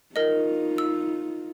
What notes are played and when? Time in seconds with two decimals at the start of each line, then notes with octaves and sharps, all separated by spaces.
0.16 D#4 F4 A#4 D#5
0.78 E6